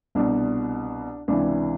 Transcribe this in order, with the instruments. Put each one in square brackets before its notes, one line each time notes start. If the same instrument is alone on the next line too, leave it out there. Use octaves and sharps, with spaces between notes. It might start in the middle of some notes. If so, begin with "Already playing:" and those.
[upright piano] C2 B2 D4
C#2 C3 E3 D4